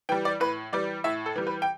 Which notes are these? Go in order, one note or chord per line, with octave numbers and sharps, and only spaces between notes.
E3 G3 G5
D5
A2 B4
E3 G3 D5
A2 E5
A4
E3 G3
B4
G5